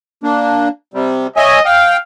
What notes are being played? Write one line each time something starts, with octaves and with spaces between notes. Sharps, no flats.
A#3 D4
C3 G3
C#5 D#5 E5 G#5
F5 G5